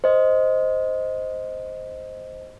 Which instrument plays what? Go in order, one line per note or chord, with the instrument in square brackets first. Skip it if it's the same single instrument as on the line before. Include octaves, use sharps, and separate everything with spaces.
[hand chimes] C5 D#5